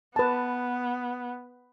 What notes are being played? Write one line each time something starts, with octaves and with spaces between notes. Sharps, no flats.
B3 B4 A5